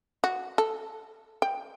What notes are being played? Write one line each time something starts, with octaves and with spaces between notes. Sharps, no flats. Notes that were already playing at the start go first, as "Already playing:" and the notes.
F#4
A4
G5